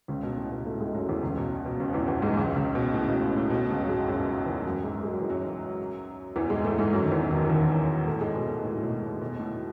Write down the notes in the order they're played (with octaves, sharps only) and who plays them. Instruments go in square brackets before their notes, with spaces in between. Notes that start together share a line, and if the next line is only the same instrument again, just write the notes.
[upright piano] C#2 C#3
B2
A2
B2
A2 A3
G#2 G#3
F#2 F#3
E2 E3
C#2 C#3
B2
B2
C#2 C#3
E2 E3
E2 E3
G#2 G#3
C#2 C#3
C#2 C#3
B2
A2
C#3
B2
A2
A2
B2
C#2 C#3
F#3
G#2 G#3
F#2 F#3
E2 E3
F#2 F#3
G#2 G#3
G#3
F#3
E3
F#2 F#3
E2 E3
G#2 G#3
A2 A3
G#2 G#3
F#2 F#3
D#3
E2 E3
D#2 D#3
E3
D#2 D#3
A2 A3
G#2 G#3
B2
A2
A2
A2
B2
A2
B2
A2